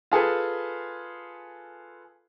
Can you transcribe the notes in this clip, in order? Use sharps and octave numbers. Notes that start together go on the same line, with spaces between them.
F4 G#4 A4 B4